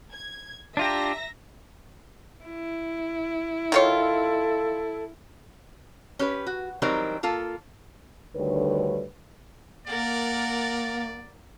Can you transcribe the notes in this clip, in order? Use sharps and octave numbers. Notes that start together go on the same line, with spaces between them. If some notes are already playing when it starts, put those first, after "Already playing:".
G#6
D4 F4 G4 E5 A#5 A#6
E4
D#3 F4 A4 C#5
C#4 G4 B4
F#4
E3 F#3 G3 C4 D#4 A#4
A#3 F4 A4
D2 D3 D#3 G3 B4 C#5
A#3 A#4 D5 F#5 A6